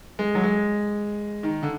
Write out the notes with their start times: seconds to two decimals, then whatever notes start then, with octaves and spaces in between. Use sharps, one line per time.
0.19 G#3
0.35 F#3
0.44 G#3
1.43 D#3
1.63 D3